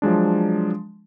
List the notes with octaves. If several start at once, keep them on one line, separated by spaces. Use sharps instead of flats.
F3 F#3 G#3 D4